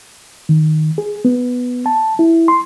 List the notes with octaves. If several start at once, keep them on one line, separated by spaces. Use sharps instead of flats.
D#3
G#4
B3
A5
E4
C6